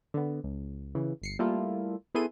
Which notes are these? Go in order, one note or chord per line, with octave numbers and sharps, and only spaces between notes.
D3 B3
C#2
C#3 E3
G1 C7 C#7
G3 A3 A#3 E4 F4 A4
B3 E4 G#4 A4 C6 D#7